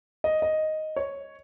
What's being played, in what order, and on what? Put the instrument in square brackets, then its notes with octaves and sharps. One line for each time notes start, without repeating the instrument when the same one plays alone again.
[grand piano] D#5
D#5
C#5